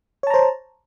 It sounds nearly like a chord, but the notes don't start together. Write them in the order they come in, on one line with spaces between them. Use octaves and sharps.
C#5 A5 A#5 C5